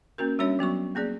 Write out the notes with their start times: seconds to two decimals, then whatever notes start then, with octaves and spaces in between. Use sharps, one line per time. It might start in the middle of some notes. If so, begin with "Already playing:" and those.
0.18 A#3 C#4 F#4 A#4
0.39 G3 C#4 D4 F#4 C#5 E5
0.59 F#3 B3 F#4 C#6
0.95 A#3 C4 G#4 D5